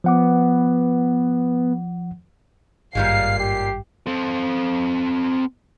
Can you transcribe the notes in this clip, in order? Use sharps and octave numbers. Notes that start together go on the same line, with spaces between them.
F3 B3 F#5 D6
G#1 G2 A#2 G3 G#3 F5 C7
G4
C4 A4